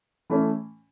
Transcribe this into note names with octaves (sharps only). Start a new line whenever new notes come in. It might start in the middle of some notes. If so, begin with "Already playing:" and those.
E3 A3 C#4